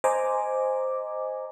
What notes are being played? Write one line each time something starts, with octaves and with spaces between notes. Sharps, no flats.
C5 D#5 G#5 A#5 D6